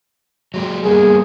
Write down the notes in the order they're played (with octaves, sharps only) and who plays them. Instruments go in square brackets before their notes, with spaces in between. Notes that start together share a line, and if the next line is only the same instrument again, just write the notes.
[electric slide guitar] F#3 G#3 G4
[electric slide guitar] G3 A#3 B3 [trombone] G#4